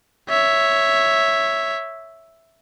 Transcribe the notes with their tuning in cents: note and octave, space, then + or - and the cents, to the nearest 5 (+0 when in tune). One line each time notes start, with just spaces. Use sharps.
C#5 +0 E5 +0